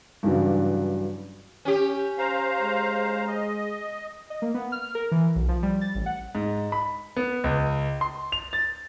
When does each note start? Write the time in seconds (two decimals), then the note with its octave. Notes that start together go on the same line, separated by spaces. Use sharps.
0.23 G2 C#3 E3 F#3 D4
1.65 C#4 G4
2.18 C5 F5 A#5
2.61 G#3
3.28 D#5
4.30 D#5
4.42 A#3
4.54 B3
4.72 F6
4.95 A#4
5.12 E3
5.35 B1
5.49 F3
5.63 G3
5.81 A6
5.95 A1
6.06 F#5
6.35 G#2
6.72 B5
7.16 B3
7.44 C#2
8.01 C6
8.32 F7
8.53 A6